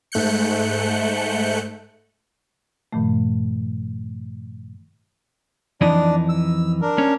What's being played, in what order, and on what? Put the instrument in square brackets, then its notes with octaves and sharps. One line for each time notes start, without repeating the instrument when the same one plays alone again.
[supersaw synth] G#2 A3 F#6 G6 C#7
[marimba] G2 A#2 D#3 F3 A3
[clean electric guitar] F2 E3 D#4 [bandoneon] D4 D5
[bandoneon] E6
D4 A#4
[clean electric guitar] C#4